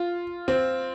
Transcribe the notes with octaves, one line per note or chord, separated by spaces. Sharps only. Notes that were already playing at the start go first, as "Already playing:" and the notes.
Already playing: F4
C4